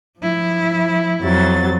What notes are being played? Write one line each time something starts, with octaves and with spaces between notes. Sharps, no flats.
F3 E4
F2 F#3 A6